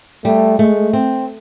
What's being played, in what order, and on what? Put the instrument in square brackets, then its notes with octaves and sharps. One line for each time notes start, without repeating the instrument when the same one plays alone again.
[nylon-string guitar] G3 [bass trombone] A3
[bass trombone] G#3 [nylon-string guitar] A3
[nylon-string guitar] C4